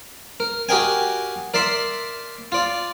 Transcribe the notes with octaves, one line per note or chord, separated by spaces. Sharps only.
A#4
F#4 G4 A#4 D#5 G5 G#5
A#4 D5 E5 C6
F4 D5